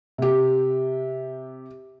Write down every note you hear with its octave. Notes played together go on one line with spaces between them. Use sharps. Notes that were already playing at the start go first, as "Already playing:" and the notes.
C3 G4